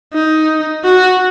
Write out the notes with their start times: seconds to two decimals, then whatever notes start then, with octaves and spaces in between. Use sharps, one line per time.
0.13 D#4
0.85 F#4